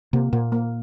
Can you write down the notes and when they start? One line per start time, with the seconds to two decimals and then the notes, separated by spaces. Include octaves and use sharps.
0.13 C3 A#3
0.33 A#2 A#3
0.52 A#3